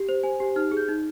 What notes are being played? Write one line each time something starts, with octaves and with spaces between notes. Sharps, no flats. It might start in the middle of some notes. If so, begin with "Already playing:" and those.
Already playing: G4
C5
C5 G#5
G4
D#4 F6
G#4
G6
D#4